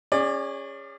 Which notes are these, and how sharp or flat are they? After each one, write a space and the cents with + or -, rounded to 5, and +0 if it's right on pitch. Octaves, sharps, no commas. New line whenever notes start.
C#4 +0 G#4 -30 D5 +20